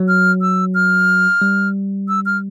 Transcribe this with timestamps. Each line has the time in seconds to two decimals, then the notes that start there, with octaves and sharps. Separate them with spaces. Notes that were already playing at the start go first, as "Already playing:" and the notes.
Already playing: F#3
0.08 F6
0.41 E6
0.75 F6
1.42 G3
2.08 E6
2.26 F6